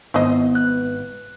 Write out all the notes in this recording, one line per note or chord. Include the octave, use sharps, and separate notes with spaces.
G#1 B3 E4 C5 D#5
F#6